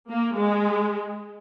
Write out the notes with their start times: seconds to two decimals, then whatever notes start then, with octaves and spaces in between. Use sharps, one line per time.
0.10 A#3
0.38 G#3